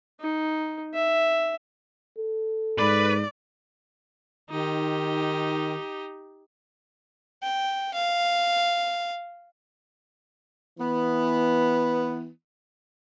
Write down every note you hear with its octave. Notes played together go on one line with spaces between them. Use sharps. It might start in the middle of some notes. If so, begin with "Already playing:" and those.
D#4
E5
A4
G#2 B4 D5 B5
D#3 D#4 G4
G5
F5
E3 B3